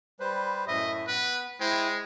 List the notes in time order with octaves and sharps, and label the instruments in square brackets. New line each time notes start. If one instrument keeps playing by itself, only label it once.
[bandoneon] G3 B4 C5
[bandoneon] F#2 A2 E5 [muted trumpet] D#5
[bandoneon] B3 [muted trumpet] B4
[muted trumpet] G#3 [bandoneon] E4 C5 G5